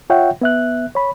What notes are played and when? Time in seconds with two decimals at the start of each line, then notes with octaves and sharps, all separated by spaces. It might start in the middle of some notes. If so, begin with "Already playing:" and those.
0.10 F4 C#5 E5 F#5 G5
0.42 B3 E5 F#6
0.95 C#5 B5